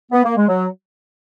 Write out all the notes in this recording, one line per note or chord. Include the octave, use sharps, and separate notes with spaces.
B3
A#3
G#3
F#3